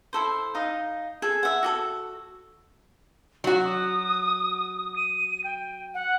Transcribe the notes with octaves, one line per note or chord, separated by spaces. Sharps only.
E4 A4 C5
D#4 D#5 F5
G#4 A4
E5 F#5
F#4 G4 A4
F#3 F#4 C#6
D#6
D#7
G5
F#5